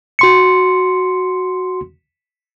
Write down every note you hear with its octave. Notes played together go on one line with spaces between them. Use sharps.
F#4 C6 C#7